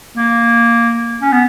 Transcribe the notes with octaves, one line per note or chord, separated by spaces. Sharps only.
A#3
C#4
B3